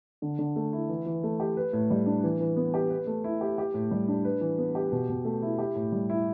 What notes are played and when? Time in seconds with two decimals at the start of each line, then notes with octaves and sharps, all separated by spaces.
0.22 D3
0.39 D3
0.56 A3
0.73 E4
0.89 E3
1.06 E3
1.23 A3
1.40 G4
1.57 B4
1.73 A2
1.90 G3
2.06 D4
2.24 E3
2.40 E3
2.56 B3
2.74 G4
2.90 B4
3.07 A3
3.24 E4
3.41 G4
3.58 G4
3.74 A2
3.91 G3
4.08 D4
4.25 B4
4.41 E3
4.58 B3
4.75 G4
4.92 B2
5.09 B2
5.25 A3
5.42 E4
5.59 G4
5.75 A2
5.92 G3
6.10 E4